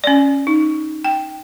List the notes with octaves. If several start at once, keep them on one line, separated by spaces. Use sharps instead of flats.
C#4 D5
D#4
G5